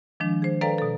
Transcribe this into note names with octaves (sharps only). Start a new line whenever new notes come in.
D#3 F3 G#3 D4
G#4 C5
A4 B4 D5 F5 G5 A#5
B2 A4